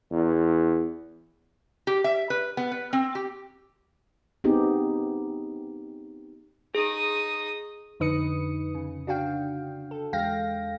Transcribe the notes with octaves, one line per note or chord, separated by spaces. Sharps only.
E2
G4
E5
B4
B3
B4
C4
G4
B3 C4 D#4 G4 G#4
D#4 G#4 D#6
F2 D3 D#4 B4 D#6 C#7
C#3
D4 F#4 F5 G5
A4
E2 G#3 F5 G5 A#6